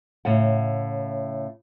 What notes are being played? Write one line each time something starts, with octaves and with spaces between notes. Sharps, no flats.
A2 C#3 C#5 F#5